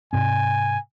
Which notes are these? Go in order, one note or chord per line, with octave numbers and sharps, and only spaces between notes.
G#2 C3 C4 G#5